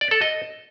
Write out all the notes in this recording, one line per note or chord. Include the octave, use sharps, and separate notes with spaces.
D5
A4
D#5